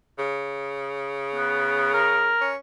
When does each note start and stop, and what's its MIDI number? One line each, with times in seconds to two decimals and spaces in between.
0.19 2.30 49
1.35 1.89 59
1.93 2.49 70
2.41 2.56 61